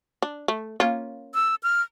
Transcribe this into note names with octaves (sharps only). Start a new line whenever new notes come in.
D4
A3
A#3 C#4 F4
E6
F6